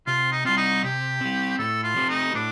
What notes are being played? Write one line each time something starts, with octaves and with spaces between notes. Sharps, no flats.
C3 F4
D#4
G3 C4 F4
D#4
C3 G4
G3 C4
A2 A4
F4
F3 A3 C4 G4
D#4
A2 D4